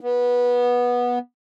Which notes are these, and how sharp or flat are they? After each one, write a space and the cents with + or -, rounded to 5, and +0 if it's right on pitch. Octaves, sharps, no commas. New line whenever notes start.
B3 -15